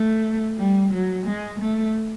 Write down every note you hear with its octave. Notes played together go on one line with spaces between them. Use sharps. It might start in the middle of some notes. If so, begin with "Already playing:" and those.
Already playing: A3
G3
F#3
G#3
A3